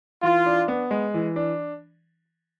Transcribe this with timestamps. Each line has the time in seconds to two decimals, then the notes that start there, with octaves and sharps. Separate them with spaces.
0.23 E3 F4
0.46 D4
0.68 B3
0.91 G#3
1.14 E3
1.36 D4